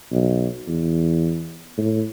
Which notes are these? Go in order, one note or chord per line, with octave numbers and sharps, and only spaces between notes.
B1
E2
A2